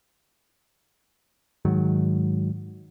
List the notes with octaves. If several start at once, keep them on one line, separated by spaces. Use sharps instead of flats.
G#2 D#3 F#3